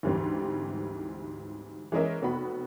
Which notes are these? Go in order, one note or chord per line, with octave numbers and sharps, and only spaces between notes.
D2 G#2 E3 G3 C4
E3 G#3 C#4 A#4 D#5 E5
F1 B3 F#4 B5